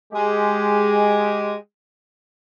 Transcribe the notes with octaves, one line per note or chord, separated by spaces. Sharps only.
G#3 G4